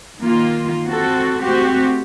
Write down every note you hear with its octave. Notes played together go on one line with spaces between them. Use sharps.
D#3 A#3 F4
C4 F#4 A4
A3 C4 F#4 G4